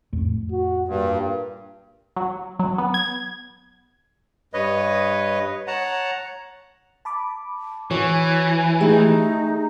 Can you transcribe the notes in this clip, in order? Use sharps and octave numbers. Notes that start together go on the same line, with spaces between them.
F2 A2 A3
F#4
G2 A#2
F#3
F#3
B3
G#6
G2 B4 C#5 D#5
C#5 F#5 A5 A#5
A5 B5 D6
E3 F#4 C#5 G#5
A3 D#4 G4 G#4 E5